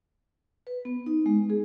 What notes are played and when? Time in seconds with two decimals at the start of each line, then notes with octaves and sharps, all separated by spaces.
0.67 B4
0.85 B3
1.06 D#4
1.26 G#3
1.50 G#4